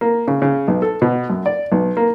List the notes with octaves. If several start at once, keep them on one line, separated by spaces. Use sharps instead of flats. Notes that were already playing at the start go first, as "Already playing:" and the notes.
A#3
C#3
C#3
B1
A4
B2
F#2
D5
B1
A#3